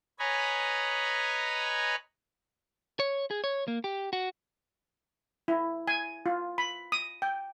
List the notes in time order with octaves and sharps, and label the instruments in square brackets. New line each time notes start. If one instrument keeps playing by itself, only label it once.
[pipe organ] B4 C#5 D#5 G#5 A#5 B5
[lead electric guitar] C#5
G#4
C#5
A#3
G4
F#4
[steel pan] E4
G#5
F4
B5
D#6
G5